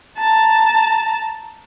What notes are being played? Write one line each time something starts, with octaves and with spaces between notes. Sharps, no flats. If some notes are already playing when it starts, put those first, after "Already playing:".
A5 A#5